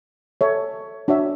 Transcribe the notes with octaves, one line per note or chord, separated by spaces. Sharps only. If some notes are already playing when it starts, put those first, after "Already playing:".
A4 C#5 E5
D4 F#4 C#5 E5